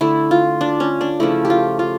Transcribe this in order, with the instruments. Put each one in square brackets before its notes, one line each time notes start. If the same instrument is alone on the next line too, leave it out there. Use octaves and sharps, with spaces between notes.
[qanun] D3 A3 E4
F4
D4
C#4
D4
C#3 F3 A3 E4
G4
F4
F4